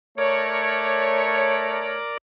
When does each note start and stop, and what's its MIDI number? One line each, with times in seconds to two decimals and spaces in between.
0.18 2.03 57
0.18 2.17 70
0.18 1.97 73
0.18 2.17 74